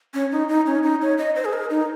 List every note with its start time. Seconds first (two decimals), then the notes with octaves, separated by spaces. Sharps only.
0.14 C#4
0.32 D#4
0.49 D#4
0.66 C#4
0.83 D#4
1.02 C#5
1.18 D#5
1.36 C5
1.45 G#4
1.53 A#4
1.70 D#4